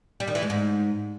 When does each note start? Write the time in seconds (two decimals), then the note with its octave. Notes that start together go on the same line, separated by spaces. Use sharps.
0.20 G3
0.28 D#3
0.35 E3
0.42 G#3
0.50 G#2